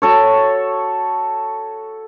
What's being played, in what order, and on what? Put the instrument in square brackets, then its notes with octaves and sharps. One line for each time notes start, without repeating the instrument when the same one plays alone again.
[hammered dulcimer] F#4 A4 C#5